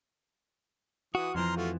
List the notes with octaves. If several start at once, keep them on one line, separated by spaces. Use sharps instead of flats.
E3 F#4 D#6
F2 E3 F3 A#5 C6 F6
A3 F4 F#4